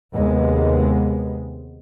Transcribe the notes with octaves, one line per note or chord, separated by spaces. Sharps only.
D#2 C3 G#3 B3